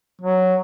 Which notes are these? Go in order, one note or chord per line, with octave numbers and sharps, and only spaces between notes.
F#3